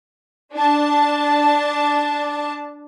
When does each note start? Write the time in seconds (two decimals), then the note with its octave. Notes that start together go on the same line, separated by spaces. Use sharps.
0.56 D4 A5